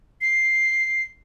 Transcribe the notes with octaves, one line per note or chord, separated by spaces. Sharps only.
C7